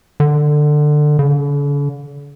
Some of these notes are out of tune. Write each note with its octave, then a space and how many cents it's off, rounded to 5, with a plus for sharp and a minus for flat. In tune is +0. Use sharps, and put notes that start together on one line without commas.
D3 +20
D3 -45